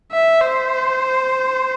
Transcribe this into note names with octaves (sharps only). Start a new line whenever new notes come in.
E5
C5